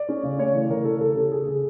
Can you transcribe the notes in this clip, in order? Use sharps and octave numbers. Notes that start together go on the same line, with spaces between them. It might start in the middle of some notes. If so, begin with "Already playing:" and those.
Already playing: D5
C#4
C#3
A3 C#5
E3
E3 A#4
C#3 A4
C#3 A4
C#3 G4
C#3 G#4
C#3